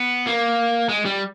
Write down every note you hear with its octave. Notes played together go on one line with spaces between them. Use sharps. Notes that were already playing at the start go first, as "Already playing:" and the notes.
Already playing: B3
A#3
G#3
G3